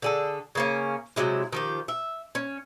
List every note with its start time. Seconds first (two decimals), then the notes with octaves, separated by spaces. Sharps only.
0.02 D3 G#4 A4
0.55 C#3 A#3 C#4
1.16 C3 F#3 G#3 E4
1.53 D#3 F3 G4
1.88 E5
2.35 C#4